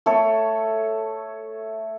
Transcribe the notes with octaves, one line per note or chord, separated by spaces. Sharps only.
A3 A4 C#5